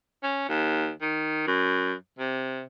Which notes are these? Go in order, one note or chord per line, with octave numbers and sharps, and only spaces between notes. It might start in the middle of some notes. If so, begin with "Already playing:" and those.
C#4
D#2
D#3
F#2
C3